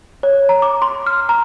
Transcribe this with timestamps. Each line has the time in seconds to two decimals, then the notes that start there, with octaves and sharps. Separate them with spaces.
0.23 C#5
0.49 A#5
0.62 D6
0.82 C6
1.06 F6
1.29 A#5